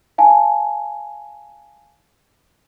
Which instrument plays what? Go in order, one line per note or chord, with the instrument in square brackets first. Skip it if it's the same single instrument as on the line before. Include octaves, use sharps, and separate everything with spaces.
[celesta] F5 G#5 A5